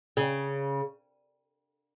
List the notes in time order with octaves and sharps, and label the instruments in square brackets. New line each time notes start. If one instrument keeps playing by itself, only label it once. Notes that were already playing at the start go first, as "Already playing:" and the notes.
[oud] C#3